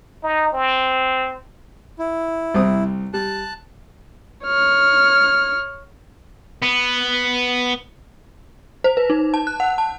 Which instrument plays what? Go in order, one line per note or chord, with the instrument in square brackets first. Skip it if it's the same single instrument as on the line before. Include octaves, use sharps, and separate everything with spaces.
[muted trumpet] D#4
C4
[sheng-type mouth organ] E4
[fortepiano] C2 C4 D#6
[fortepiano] G3 [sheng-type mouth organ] A5 F#6
[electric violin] C#5 F6
[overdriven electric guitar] B3
[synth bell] C5
B4
D#4
A5
F#6
F#5
A5